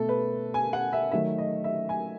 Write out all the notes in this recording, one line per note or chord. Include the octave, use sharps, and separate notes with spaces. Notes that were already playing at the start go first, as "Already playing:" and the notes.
Already playing: B2 A3 A4
B4
G#5
F#5
E5
D#3 F#3 A3 E5
D#5
E5
G#5